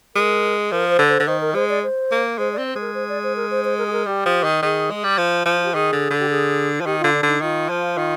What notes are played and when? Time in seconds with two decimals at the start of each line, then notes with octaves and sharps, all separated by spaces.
0.15 G#3 A#4
0.72 F3 A#4
0.90 C5
0.99 D3
1.09 C5
1.20 D3
1.27 D#3 C5
1.41 A#4
1.55 G#3 C5
1.69 D5
1.83 C5
2.12 A#3
2.38 G#3 C5
2.53 D5
2.58 C4
2.67 C5
2.76 G#3
2.81 A#4
2.94 C5
3.09 D5
3.23 C5
3.36 A#4
3.51 C5
3.64 C5
3.78 A#4
3.87 G#4
3.93 A#4
4.06 G3 G4
4.26 F3
4.43 D#3
4.62 D#3 G#4
4.90 G#3
5.04 G3
5.18 F3
5.46 F3
5.56 F4
5.65 G4
5.74 D#3 G#4
5.93 D3
6.11 D3
6.20 G4
6.30 G#4
6.81 F3
6.86 D#3 G4
7.00 D3 F4
7.13 D4
7.23 D3 D#4
7.41 D#3 F4
7.69 F3
7.98 D#3